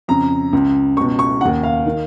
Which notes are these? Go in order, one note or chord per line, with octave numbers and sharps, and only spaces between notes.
F2 C#3 A#5
C#2 C#3
C#2 B2 C#6
C#6
D#2 C#3 F#5
F5
D#3